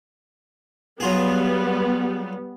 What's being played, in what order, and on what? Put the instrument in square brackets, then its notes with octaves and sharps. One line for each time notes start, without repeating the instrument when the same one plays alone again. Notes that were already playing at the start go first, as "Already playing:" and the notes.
[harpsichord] F#3 F4 G#4 [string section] G3 B3